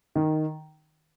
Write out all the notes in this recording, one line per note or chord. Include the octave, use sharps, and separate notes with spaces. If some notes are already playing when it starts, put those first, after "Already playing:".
D#3